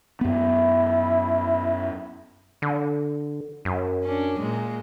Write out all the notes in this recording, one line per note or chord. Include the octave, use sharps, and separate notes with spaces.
F#2 B3 E4
D3
F#2
C#4 D4
A#2 G#3